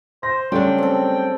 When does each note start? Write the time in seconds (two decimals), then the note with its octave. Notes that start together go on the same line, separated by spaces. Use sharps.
0.23 C5 A#6
0.52 C#3 F#3 G3 A3 C#4 D4 G5
0.78 C4 A4